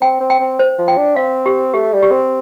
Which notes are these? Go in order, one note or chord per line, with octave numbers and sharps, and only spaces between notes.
C4 G5
C4
G5
C4
C5
F3
G5
D4
C4 F5
G4
A3 G4
G3
G4
C4